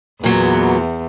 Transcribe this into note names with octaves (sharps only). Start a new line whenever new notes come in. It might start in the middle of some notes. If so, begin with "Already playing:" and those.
E2 A#2 F#3 B3